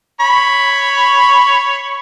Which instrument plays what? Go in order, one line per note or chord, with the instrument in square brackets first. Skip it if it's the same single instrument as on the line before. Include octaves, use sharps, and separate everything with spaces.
[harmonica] C#5 B5